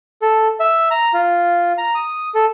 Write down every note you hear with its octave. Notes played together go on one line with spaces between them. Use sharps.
A4
E5
A#5
F4
A#5
D#6
A4